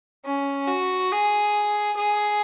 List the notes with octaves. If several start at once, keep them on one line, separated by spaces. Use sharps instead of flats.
C#4
F#4
G#4
G#4